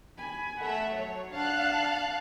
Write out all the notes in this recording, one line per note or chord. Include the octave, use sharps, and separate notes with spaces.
G#5 B5
A3 E5 F#5
F#3 C#5
D4 F5 F#5 A5 F#6